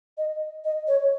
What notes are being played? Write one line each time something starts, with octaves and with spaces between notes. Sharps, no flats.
D#5
D#5
C#5